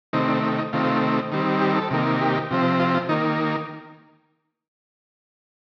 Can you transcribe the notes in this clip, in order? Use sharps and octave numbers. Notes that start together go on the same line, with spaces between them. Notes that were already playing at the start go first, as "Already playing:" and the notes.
C3 D#3 A3 C4 D#4
D4
C4
D#4
C3 D#3 A3 C4 F4
D#3 G3 C4
G4
A4
C3 D#3 A#3
G4
C3 F3 C4
F4
F4
D#3 A#3 D#4